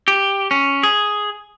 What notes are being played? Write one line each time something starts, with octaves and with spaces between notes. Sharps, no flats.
G4
C#4
G#4